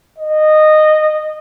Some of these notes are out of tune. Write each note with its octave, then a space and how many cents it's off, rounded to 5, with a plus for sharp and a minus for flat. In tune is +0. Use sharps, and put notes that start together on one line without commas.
D#5 -15